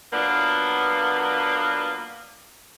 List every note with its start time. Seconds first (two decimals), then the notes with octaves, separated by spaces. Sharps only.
0.12 F#3 A#3 B3 D4 F4 B4